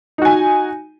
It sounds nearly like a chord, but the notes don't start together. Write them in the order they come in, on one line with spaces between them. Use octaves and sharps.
D#4 F#4 G#5